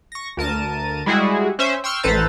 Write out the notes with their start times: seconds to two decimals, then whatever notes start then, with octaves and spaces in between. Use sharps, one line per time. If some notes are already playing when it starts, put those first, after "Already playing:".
0.12 C#6 A#6
0.37 D2 A#4 A5 D#7
1.06 G3 G#3 E4 F#4 G#4
1.59 C#4 C5 E5
1.84 G5 C6 C#6 E6 F6
2.03 A1 A4 B4 C5 A#5 A6